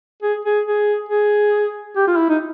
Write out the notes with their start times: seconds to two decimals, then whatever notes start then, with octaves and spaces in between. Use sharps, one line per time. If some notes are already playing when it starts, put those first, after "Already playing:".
0.22 G#4
0.45 G#4
0.65 G#4
1.09 G#4
1.96 G4
2.08 F4
2.17 E4
2.29 D#4